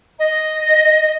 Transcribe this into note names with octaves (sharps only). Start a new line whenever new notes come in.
D#5